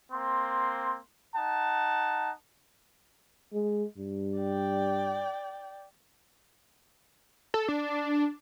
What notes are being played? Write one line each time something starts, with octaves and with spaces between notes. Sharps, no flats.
A#3 C4 C6
D#4 F#5 A5
G#3
G2
D5 G5
A4
D4